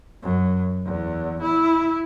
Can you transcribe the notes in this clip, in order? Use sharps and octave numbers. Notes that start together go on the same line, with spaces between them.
F#2
E2
E4